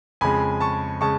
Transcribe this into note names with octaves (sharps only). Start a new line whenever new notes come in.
F2 C#3 G#3 G#5 B5
A5 C#6
C#3 G#3 A5 C#6